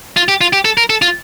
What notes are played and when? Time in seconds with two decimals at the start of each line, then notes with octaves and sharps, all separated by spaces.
0.16 F4
0.28 G4
0.41 F4
0.53 G4
0.65 A4
0.77 A#4
0.90 A4
1.02 F4